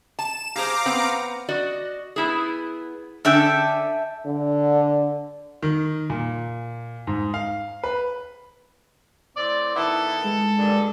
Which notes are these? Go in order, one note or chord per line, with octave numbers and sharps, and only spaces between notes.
A5 E7
G4 G#4 C5 F5 A#5 D6
B3 C4 C5
F#4 D5 D#5
B3 E4 G#4
D3 C#4 D4 A4 E5 G5
D3
D#3
A#2
G#2
F5
B4
A2 C4 D5
D#3 B3 E4 A4
G#3
G2 A#2 D3